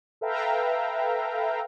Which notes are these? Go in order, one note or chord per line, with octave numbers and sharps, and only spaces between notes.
A4 B4 E5 F5 G5 A#5